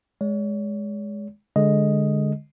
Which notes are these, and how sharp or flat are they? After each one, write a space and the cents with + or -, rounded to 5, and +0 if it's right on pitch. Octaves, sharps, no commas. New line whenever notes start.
G#3 +0 C#5 +40
D3 +0 G#3 +0 D#5 +0